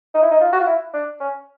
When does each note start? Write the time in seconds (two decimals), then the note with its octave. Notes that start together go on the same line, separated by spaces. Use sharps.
0.14 D#4
0.23 E4
0.31 D#4
0.41 F4
0.53 F#4
0.60 F4
0.67 E4
0.93 D4
1.20 C#4